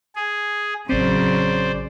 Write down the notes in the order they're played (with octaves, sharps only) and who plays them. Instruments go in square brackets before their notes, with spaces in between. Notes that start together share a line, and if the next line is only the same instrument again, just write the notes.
[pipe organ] G#4
[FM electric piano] A1 C4 [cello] C#3 F#3 [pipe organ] C5 D5